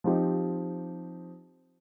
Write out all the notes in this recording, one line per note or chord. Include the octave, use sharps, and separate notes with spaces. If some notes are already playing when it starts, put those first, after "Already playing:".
F3 C4 D#4 G4